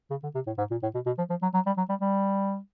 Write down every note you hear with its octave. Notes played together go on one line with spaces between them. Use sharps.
C#3
D3
C3
A2
G#2
A#2
A2
B2
B2
F3
F3
F#3
F#3
G3
F#3
G3
G3